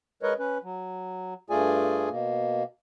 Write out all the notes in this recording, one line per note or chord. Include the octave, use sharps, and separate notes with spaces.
G#3 A#4 B4 C#5 D#5
C#4 B4
F#3
G2 A3 F4 G#4 D5 G#5
B2 A#3